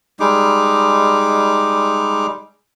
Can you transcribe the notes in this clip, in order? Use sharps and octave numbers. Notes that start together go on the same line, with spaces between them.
G3 G#3 D#4 D6